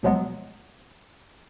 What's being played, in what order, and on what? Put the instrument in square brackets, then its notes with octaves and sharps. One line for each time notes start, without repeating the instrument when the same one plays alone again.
[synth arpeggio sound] D2 B2 F3 F#3 G#3 B3